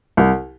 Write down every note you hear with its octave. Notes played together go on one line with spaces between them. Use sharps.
C2